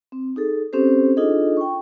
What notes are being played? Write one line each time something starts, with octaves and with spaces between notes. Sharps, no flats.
C4
D#4 G#4 A4
C4 C#4 G4 A4 C5
D4 D#4 F4 G#4 A4 D#5
G5 C#6